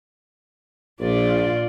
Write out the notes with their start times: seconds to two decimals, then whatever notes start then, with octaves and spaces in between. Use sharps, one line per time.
1.01 A#1 A#2 F4 D5